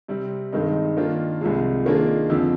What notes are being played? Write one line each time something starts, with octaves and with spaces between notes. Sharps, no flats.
C3 G3 C4
G2 D#3 G#3 C4 D#4
D#3 A#3 D4 F4
C2 C3 F3 G#3
D#3 A#3 D4 F4 G#4
F2 D3 F3 C4